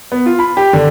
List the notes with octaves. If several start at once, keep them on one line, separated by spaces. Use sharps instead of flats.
B3
F4
B5
G4
D3